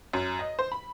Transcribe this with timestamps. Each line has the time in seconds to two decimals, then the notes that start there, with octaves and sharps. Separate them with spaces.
0.13 F#2
0.39 D#5
0.59 C5
0.72 B5